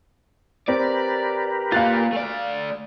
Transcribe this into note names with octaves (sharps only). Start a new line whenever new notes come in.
C4 G4 A#4 B4 D5
A#3 F4 F5 F#6 A6
A3 D5